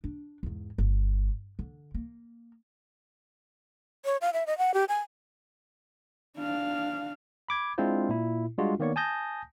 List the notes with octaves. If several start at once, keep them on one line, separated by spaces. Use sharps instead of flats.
D4
E2 G#2
G1
D3
A#3
C#5
F5
E5
D#5
F#5
G4
G#5
D4 F5
B5 D6 G#6
G#3 C4 D4 E4 F4 C5
A#2 E4
G3 G#3 D4 F4 F#4
D#3 A#3 B3 C#5 D5 C#6
G#5 A5 D#6 G6 A#6